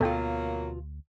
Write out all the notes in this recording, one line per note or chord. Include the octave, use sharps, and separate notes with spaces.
D2 B2 F#3 A#3 F4 A4 G5